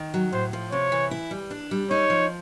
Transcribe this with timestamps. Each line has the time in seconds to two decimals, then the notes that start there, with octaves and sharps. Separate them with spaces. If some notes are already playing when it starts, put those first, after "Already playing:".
Already playing: D#3
0.14 F#3
0.32 A2 C5
0.53 F3
0.72 C3 C#5
0.92 E3
1.11 E4
1.31 G3
1.51 D4
1.71 G3
1.91 D#4 C#5
2.10 F3